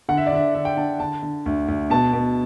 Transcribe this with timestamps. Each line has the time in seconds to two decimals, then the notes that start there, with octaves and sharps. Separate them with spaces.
0.09 D3 F#5
0.17 E5
0.26 D5
0.32 D3 E5
0.54 D3 E5
0.65 G5
0.77 D3 A5
1.00 D3 A5
1.23 D3
1.46 D2
1.68 D2
1.90 B2 A5
2.13 B2